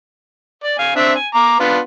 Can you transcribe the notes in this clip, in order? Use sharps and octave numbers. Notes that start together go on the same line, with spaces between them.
D5
F5 G#5
C4 D4 E5
G#5
A#5 D6
B3 D4 F4